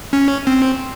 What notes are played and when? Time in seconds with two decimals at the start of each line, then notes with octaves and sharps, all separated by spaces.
0.13 C#4
0.47 C4